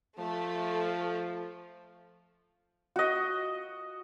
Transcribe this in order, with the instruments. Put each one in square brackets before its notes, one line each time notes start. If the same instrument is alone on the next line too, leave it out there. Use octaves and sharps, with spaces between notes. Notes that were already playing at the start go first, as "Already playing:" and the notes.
[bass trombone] F3 [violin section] A3
[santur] F#4 D#5